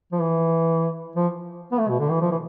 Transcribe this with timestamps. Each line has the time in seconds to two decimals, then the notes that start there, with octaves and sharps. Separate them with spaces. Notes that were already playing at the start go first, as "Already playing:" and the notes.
0.12 F3
0.21 E3
1.16 F3
1.72 B3
1.79 A3
1.89 B2
2.00 D3
2.10 E3
2.21 F3
2.31 E3